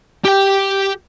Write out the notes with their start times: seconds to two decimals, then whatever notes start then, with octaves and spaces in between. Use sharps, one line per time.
0.24 G4 G5